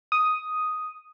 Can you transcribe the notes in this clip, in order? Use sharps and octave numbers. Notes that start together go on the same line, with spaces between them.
D#6